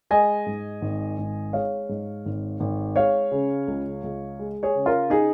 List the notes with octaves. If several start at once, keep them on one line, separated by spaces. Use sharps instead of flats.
G#3 D#5 G#5
G#2
G#1
G#1
G#3 C#5 F5
G#2
G#1
G#1
G#3 C#5 F5
C#3
C#2
C#2
G#3
G#4 C#5
C#3
F4 A#4
D#4 G#4